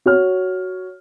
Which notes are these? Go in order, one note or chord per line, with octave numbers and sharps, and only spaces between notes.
F#4 C#5 F6